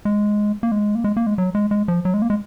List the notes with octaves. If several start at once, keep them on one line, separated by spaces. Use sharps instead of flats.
G#3
A#3
G#3
A#3
G#3
A#3
G#3
F#3
G#3
G#3
F3
F#3
G#3
A#3
G#3